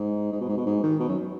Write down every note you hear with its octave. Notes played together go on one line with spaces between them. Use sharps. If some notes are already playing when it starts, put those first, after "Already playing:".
Already playing: G#2
G#2
B2
G#2
B2
G#2
D#3
B2
F#2